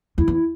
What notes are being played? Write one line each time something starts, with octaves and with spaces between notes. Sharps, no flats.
E2 E4
E2
E4